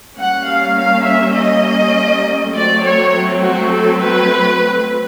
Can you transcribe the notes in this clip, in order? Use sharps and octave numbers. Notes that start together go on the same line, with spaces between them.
G3 A#3 C#4 F#5
F5
F5
E5
D#5
F#3 A3 C4 D5
C#5
F#4
A4
B4